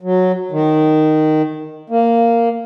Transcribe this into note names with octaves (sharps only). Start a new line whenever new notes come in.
F#3
D#3
A#3